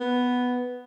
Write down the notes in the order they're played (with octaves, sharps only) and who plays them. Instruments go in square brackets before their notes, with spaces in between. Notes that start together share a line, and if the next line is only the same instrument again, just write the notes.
[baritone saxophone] B3